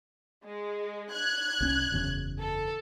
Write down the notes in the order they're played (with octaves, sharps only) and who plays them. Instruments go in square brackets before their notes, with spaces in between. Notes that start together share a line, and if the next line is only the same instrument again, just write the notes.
[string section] G#3
F#6 G#6
[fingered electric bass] C2 C4 C#4
F#1 E2 C#3
[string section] A4